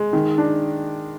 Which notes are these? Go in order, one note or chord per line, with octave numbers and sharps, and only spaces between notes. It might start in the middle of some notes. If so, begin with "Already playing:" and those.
Already playing: G#3
D#3
D4